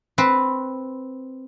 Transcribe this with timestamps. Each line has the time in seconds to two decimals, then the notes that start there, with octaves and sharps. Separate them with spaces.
0.18 C4 B4